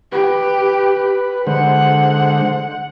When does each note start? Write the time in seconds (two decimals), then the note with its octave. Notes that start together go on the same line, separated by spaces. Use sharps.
0.12 G4 B4
1.47 D3 G#3 C5 F#5